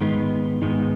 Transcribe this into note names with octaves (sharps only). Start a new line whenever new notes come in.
G#2 D#3 G#3 B3 D#4
G#2 D#3 G#3 B3 D#4